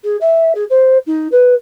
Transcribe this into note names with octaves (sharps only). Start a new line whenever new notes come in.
G#4
E5
G#4
C5
D#4
B4